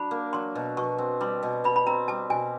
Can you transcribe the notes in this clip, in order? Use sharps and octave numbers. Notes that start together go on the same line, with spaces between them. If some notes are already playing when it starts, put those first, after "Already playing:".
Already playing: F#3 D4 B5
A#3
F#3 C6
B2
B2 C#6
C4
G3 C6
B2
B2 B5
B5
C4 A#5
G3 A5
B2 G#5